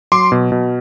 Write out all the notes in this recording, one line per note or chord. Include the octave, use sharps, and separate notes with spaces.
F#3 C6 D6
B2
B2